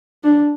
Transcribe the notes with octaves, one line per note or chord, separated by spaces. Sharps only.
D4